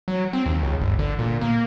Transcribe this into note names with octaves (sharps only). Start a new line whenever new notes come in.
F#3
C4
D#2
C#2
G1
D3
A#2
A#3